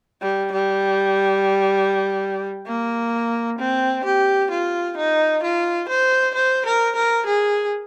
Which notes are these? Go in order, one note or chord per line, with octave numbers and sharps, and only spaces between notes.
G3
G3
A#3
C4
G4
F4
D#4
F4
C5
C5
A#4
A#4
G#4